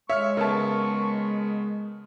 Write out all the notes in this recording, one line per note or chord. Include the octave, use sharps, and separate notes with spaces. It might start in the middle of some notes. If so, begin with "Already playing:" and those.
G#3 C#5 E5 C#6 F6
C#3 B3 A#4 A5